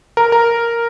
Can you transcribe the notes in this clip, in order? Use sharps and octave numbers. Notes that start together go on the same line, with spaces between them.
A#4
A#4